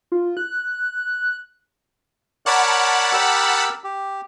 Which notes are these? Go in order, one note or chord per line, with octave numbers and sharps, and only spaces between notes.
F4
F#6
A#4 C#5 D5 F#5 A5 B5
G4 A#4 E6
G4